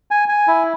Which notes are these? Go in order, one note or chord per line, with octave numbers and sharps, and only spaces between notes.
G#5
G#5
E4